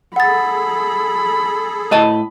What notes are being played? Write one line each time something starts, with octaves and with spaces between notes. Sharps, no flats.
G#4 A4 F#5 B5 A6
A2 D#5 A5